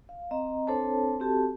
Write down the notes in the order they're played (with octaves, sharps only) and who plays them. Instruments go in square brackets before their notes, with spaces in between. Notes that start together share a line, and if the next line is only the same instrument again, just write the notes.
[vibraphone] F5
C4 D#5 A#5
C4 D4 A4 C5 C#5 A5
C4 F#4 G4 A4 A5